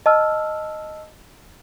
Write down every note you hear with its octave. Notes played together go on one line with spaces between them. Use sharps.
D#5 A5 E6 F6